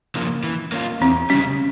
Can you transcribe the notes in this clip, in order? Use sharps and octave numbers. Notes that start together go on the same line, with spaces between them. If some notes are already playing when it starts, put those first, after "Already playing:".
C#3 F3 A#3
E3
A#3 C#4 F4
E2 C4
C#3 G3 C#4